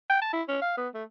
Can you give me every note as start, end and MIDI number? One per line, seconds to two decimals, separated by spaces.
0.10 0.18 79
0.22 0.33 81
0.33 0.43 64
0.48 0.58 61
0.62 0.73 77
0.77 0.88 59
0.95 1.04 57